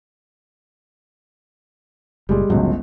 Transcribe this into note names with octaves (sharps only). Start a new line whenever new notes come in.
F#1 A#2 G3 G#3
G1 C#2 C#3 F#3